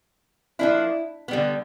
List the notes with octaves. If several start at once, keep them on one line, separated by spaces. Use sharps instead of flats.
F3 A#3 D4 E4
D3 G3 B3